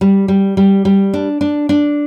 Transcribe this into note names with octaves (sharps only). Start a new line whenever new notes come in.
G3
G3
G3
G3
D4
D4
D4